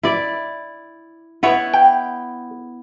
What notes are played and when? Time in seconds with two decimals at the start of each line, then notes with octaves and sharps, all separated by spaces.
0.03 E4 D5
1.43 B3 E4 C#5
1.74 G5